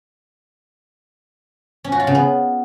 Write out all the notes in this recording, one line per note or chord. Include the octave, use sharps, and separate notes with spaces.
C#4
F#4
F4
C#3
B3